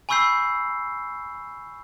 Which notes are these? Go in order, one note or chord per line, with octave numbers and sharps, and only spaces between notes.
G#5 B5 C#6 E6 G6 C7